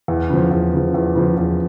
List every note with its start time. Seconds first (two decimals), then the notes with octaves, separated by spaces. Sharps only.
0.08 E2
0.30 C#3 F3
0.51 E2
0.73 C#3 F3
0.94 E2
1.15 C#3 F3
1.37 E2